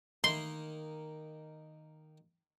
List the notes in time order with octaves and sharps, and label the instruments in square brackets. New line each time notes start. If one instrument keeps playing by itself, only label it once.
[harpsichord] D#3 A#3 D#4 [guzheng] C6